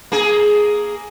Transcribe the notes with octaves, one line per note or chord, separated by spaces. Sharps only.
A#3 G#4